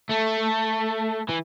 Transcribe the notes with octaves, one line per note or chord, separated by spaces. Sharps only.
A3
E3